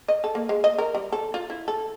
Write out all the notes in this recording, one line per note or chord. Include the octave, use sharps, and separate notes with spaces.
D#5
A4
A#3
G#3
D#5
A#4
G3
A4
F4
E4
A4